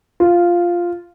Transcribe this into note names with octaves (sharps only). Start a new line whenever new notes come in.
F4